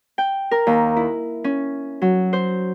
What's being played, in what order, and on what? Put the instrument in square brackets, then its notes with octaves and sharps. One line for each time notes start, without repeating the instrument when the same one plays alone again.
[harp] G5
A#4
D#2
E4
C#4
F#3
C5